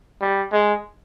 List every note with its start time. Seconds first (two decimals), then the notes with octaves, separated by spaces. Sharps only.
0.22 G3
0.53 G#3